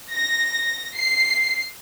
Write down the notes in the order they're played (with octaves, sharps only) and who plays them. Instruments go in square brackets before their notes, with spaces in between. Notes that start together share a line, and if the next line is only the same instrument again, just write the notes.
[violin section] A#6
C7